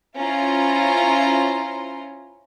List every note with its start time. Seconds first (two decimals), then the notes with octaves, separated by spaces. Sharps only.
0.18 C#4 E4 F4 C5 A#5 C6